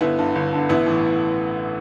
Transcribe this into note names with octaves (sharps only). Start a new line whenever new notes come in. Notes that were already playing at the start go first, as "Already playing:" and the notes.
G1 B3 E4
G2 D3
G1
G2 D3
A1 B3 E4
A2 E3